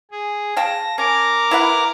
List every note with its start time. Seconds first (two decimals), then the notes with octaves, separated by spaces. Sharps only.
0.11 G#4
0.57 F5 G5 A5 A#6
0.98 C#4 A#4 A#5 D6
1.51 E4 B4 F#5